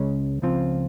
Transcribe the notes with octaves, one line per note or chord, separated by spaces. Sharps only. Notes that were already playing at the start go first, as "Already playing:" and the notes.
Already playing: C#2 C#3 G#3 C#4
C#2 C#3 F3 C4 F4